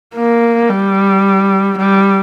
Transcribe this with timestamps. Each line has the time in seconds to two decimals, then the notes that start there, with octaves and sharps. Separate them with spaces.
0.15 A#3
0.69 G3
1.78 G3